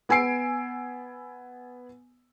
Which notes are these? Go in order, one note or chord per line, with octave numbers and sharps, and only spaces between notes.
B3 G#5 E6 C7 D7